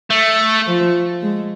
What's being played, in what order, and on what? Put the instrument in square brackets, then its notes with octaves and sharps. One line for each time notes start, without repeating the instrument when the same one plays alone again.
[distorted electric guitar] A3
[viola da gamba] F3
G#3